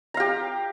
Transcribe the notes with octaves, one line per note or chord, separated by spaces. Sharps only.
G4 F5 A#5